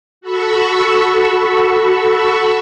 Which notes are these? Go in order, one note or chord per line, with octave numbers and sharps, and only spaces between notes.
F#4 A4 B5 C#6 E6